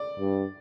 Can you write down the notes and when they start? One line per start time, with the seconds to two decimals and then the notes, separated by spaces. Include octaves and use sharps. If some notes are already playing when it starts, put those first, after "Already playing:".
Already playing: D5
0.19 G2